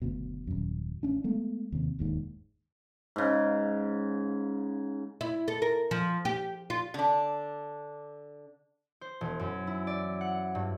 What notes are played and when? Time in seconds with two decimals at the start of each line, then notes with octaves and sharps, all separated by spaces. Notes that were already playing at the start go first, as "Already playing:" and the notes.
0.02 F#1 D2 B2
0.47 D#1 F#2
1.03 A1 C#4 D4
1.24 G#3 A3 B3
1.72 D#2 C3
1.99 E1 D#2 G#2
3.16 G#2 C#3
5.21 E4
5.48 A4
5.62 A#4
5.91 F3
6.25 G4
6.70 F4
6.94 D3 D4
9.01 C5
9.21 E1
9.40 F#2
9.67 E4
9.87 D5
10.21 F#5
10.55 G2